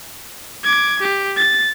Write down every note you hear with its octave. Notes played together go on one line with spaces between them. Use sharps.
D6 G#6
G4
A6